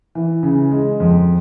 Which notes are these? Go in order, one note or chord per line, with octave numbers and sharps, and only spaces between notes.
E3
C#3
G#3
F2